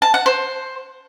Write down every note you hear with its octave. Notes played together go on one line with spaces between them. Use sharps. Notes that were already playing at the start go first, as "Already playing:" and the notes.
A5
F#5
C5